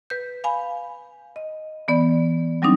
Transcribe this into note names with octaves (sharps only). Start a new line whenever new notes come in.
B4 G6
F5 G#5 B5
D#5
E3 B3 D5
F#3 G3 C4 D4 D#4